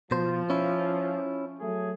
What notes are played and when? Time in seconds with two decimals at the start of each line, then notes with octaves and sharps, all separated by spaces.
0.11 B2 F3 C5
0.50 C#4 E4
1.59 F#3 A3 G#4